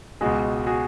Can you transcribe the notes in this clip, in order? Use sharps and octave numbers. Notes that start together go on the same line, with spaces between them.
C#2 B2 G#3 F#4 G#4
F#4 G#4